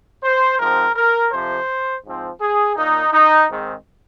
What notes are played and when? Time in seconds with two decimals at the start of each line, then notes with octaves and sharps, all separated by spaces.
0.23 C5
0.59 G#2 F3 C4 A#4
0.96 A#4
1.32 F2 C3 F3 C5
2.04 G#2 F3 C4
2.41 G#4
2.76 A#2 A#3 D#4
3.13 D#4
3.49 G#2 D#3 G#3 C4